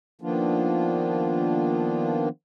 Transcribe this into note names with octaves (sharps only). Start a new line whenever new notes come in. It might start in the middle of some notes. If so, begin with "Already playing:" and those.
D#3 F3 A#3 B3 D4 F4